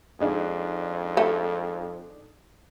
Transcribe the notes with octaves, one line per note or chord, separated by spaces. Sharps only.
F2 G#3 D4 D#4 G#4
A3